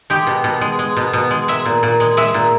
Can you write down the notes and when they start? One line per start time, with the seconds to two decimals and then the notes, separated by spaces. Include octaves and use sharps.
0.10 G#3 G4
0.27 B2
0.44 B2
0.61 G#3
0.79 G#3
0.97 B2
1.13 B2
1.31 G#3
1.48 G#3 E5
1.65 A#2
1.83 A#2
2.00 G#3
2.17 G#3 E5
2.34 A#2